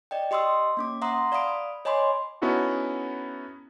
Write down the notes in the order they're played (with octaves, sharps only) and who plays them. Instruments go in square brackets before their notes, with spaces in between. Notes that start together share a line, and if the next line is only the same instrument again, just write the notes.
[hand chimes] D5 D#5 G5
G4 D#5 C6 D#6 E6
A#3 C#4 D6
E5 F#5 A#5 C6 D#6
D5 F5 B5 D#6 D7
C#5 D#5 G#5 B5 C6 D6
[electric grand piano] B3 C#4 D#4 E4 F#4 A4